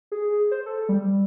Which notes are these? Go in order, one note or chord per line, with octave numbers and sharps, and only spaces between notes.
G#4
C5
A4
G3